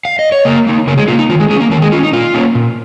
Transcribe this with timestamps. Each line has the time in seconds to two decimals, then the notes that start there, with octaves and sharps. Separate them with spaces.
0.05 F5
0.19 D#5
0.32 C#5
0.45 C#3 A#3 A#4
0.67 A#3 D#4
0.87 C#3 A#3 A#4
0.97 G#3 G#4
1.08 A#3 D#4 F4
1.19 D#4
1.29 D#3 F4
1.40 G#3 G#4
1.50 G#3 C#4 G#4
1.60 A#3 A#4
1.71 D#3 A#3 A#4
1.82 G#3 G#4
1.92 C#4 F4
2.03 D#4
2.13 A#2 F4
2.34 A#3 C#4
2.55 A#2